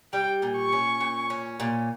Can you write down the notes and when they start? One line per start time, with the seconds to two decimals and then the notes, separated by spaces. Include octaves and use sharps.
0.13 G3 G5
0.42 A#2
0.57 C#6
0.72 C#4
1.01 A#2
1.30 C#4
1.60 A#2